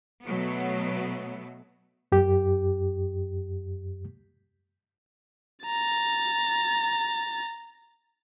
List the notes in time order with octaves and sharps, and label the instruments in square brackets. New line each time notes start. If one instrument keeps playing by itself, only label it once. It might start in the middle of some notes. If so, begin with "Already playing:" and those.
[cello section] B2 F#3 A3 B3
[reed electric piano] F#2 G4
[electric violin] A#5 A6